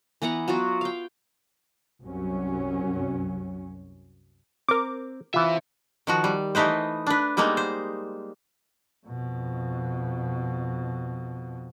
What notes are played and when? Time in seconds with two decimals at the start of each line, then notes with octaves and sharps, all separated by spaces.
0.22 E3 B3 F#5 A#5
0.48 F#3 B3 F4 F#4
0.81 F5 G5
2.02 C2 F#2 F#3 C#4
4.68 C4 A#4 D6
5.34 E3 C4 F4 E5
6.07 D#3 F3 F#4
6.24 G3
6.55 E3 A3 D#4 B4 C5
7.07 D4 B4
7.37 G3 G#3 A#3 B3 D#4
7.57 C5
9.07 F2 B2